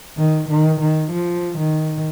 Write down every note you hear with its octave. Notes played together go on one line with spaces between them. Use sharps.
D#3
D#3
D#3
F3
D#3